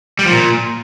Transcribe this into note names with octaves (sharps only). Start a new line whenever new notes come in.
G3
F3
A#2